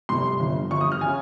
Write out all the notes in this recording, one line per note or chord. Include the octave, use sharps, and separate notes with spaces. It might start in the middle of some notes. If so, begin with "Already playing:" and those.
F1 F2 C3 G3 C6
G1 G2 F3
G1 G2 F3 C#6
D#6
F6
C#3 G#5